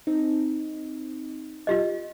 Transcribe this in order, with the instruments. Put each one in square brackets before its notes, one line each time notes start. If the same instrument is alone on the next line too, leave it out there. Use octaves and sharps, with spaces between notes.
[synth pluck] C4 D#4
[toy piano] F4 G4 D#5